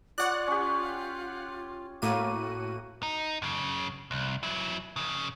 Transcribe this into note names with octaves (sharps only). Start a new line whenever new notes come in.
F4 C#5 D5 F#5 F#6
C#4 G4
A2 A#3 F#4 D#7
D#4
F#2 C#3
C2
F#3 E4
F2 C#3